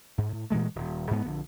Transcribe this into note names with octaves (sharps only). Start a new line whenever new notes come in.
G#2
A2
A#2 E3 G#3 A3
D#1
G#2 G#3 B3
A#1 D3